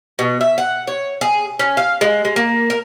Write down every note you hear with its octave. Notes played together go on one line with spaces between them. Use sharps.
B2
E5
F#5
C#5
G#4
C#4
F5
G#3
G#3
A#3
A#4